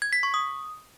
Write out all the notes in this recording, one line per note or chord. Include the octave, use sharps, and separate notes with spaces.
G#6
B6
C#6
D#6